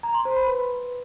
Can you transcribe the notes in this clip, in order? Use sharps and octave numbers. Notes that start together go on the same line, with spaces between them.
A#5
C6
C5
B5
B4